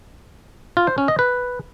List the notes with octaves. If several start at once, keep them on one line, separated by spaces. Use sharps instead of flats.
F4
C5
C#4
D#5
B4